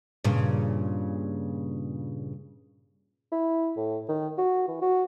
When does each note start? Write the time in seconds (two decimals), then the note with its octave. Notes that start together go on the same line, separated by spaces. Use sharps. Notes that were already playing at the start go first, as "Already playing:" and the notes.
0.24 G2 A#2 C#3
3.32 E4
3.77 A2
4.08 D#3
4.38 F#4
4.68 E3
4.82 F#4